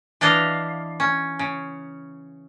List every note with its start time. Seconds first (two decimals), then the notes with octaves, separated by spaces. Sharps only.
0.21 E3 D4 E4 D#5 F5
1.00 C#4
1.39 C#3